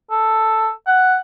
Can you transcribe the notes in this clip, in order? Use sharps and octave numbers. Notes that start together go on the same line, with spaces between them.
A4
F#5